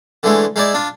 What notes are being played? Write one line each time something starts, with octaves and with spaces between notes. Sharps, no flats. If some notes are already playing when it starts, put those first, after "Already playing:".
D3 E3 G#3 A3
G#3 D#4 E4 D5
D4 F4